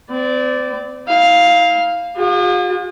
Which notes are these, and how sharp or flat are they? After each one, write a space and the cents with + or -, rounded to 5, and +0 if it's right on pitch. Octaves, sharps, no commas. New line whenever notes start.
C4 -35 D5 -5
E4 -40 F5 +0
F4 +45 G#4 -45